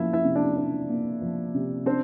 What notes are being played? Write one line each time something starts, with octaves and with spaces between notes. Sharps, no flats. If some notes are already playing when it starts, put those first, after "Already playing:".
Already playing: F3 A#3 E4 E5
E4 E5
C3
D4 D5
D4
A#3
F3
C3
C4 D4 C5